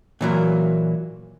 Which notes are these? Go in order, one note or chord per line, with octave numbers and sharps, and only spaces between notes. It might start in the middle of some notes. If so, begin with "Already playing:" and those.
A#2 E3 F#3 A#3